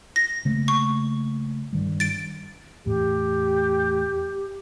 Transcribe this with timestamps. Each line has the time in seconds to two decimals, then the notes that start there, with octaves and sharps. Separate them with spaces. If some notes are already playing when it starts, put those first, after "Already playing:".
0.16 A#6
0.45 C#3 A3 A#3
0.68 C#6
1.73 G2 D#3 G3
2.00 A6 D7
2.86 E2 A2 G4